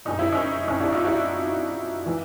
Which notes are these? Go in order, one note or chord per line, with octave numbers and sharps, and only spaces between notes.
F#1 F#2 D3 D#4
E4
C#4 D#4
C#4 D#4
D4 E4
D#4 F4
E4 F#4
E3